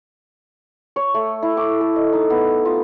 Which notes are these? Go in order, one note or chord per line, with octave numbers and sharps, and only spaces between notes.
C#5
A3
E4
D6
A4
D#5
D#4
B3
F4